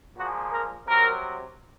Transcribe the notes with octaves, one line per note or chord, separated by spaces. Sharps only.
A#2 F3 G#3 F#4
A#4
C3 F#3 A#4